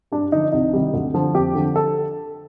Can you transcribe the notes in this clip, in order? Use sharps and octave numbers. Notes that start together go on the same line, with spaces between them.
G2 D4
D3 F3 D#4
C2 D#4
C3 D#3 G3
D2
D3 F3
F2 G4
D3 F3
A4